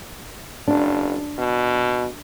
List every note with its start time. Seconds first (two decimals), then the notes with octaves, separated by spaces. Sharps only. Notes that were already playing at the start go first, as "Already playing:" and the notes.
0.68 F#1 D4
1.38 B2